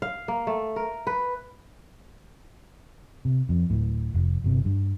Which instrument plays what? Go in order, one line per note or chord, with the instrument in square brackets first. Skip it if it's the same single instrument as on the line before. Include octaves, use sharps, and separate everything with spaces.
[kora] F5
A#3
A3
A#4
B4
[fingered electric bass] C3
F2
D1 A2
F1
G1 C3
G2